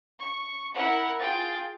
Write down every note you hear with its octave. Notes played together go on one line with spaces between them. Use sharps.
C#6
E4 A#4 F#5
F4 G#4 G5 A6